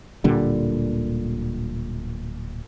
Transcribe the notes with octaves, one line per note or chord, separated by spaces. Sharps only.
D1 A#2 D3 G3